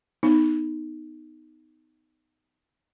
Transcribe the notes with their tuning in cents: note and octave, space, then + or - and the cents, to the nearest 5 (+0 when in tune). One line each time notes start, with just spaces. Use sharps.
B3 +25 D#4 +0